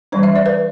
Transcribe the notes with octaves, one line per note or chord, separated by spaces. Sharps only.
E3 G3 D4 C5
E5
D5
B4